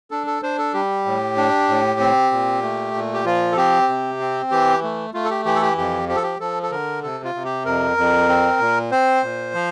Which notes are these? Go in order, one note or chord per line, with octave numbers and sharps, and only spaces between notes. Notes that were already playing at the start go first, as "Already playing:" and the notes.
D4 A4
A4
D4 C5
A4
G3 G4
A2
D4
A2
C4
A#2
A3
A#2
G4
F3 F4
A4
C4 G4
C3
C4
E3 G4
A3
A3 F4
A4
G4
E3 G4
A4
G4
F2 G4
F3 G4
A4
G4
F3 A4
A4
D3 A#4
C3 A4
F4
C3
G4
F2 A#4
F2
C4
A#2
C4 C5
A#2
F3